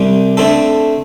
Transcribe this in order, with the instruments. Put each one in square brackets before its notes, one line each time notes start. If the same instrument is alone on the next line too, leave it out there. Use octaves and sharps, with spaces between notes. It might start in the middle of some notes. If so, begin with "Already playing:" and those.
Already playing: [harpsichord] C2 C3 G3
D3 A3 C4 A4